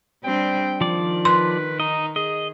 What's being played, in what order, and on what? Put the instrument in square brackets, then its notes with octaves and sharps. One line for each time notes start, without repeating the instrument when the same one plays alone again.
[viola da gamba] G3 C4 D4 [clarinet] G5
[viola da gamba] D#3 [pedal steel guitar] F3 D5
[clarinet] B4 [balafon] C6
[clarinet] D#4 [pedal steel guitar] D#5
[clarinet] G#4 [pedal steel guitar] D#5